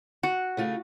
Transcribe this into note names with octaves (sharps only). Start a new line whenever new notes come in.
F#4 F#5
C#3 A3 F4